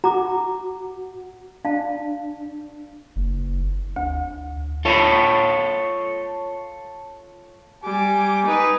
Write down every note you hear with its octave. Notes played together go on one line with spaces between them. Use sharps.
F#4 A#5 D6
D4 F5 A5
F#1
D2
F4 A4 C#5
G3 G#5 D6
D#4 B4